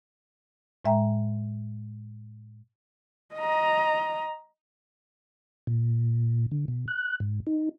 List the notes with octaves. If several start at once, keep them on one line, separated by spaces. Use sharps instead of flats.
A2 G#3 E5 G5 A#5
D#5 A#5
A#2
D3
B2
F#6
G#2
D#4